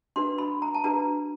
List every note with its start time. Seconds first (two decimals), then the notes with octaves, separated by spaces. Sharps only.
0.16 D4 F#4 B4 C6
0.38 B5
0.62 A#5
0.74 A5
0.84 D4 F#4 B4 A#5